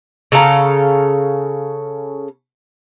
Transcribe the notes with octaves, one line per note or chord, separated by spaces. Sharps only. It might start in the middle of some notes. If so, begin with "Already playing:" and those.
C#3 A4 F5 A#5